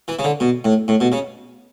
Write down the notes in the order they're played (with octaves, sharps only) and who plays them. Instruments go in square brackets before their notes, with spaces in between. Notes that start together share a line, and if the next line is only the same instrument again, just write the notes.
[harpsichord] E3
C#3
D3
B2
A2
A2
B2
C#3